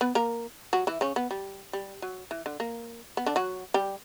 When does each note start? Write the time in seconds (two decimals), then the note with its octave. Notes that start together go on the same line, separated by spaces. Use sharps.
0.01 B3 B4
0.15 A#3 A#4
0.73 F#3 F#4
0.87 E3 E4
1.01 C#3 C#4
1.16 B3
1.31 G3
1.73 G3
2.02 F#3
2.31 E3
2.46 D3
2.60 A#3
3.17 B3
3.26 D3 D4
3.36 F#3 F#4
3.74 G3 G4